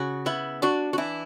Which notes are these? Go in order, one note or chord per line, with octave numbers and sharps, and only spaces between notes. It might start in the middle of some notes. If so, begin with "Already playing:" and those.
Already playing: C#3 F#4
B3 E4
D4 F#4
F#4
E3 E4